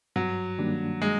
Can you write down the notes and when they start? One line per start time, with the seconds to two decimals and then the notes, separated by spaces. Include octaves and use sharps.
0.16 G2 F#3
0.58 D#3 G3 A#3 D4
1.02 G#3